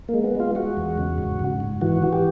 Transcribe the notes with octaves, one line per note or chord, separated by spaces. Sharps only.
A#3
G#3
B3
G#3 F4
G#3 F#4
E2
C#3
G#2
G#2
G#2
E3 F#4
E3
G4